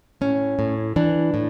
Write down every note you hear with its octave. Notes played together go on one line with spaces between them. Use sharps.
A2 C#4
A2
E3 D4
A2